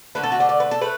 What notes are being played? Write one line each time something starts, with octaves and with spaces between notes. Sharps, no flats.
D3 A3 B4
A4
F#4
D4
D5
B4
A4
A3 B4